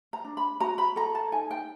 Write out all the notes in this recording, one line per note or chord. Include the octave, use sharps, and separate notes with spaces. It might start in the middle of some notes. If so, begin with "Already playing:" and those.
A#5
D4
B5
F#4 A#5
B5
A4 A#5
A5
D#4 G#5
G5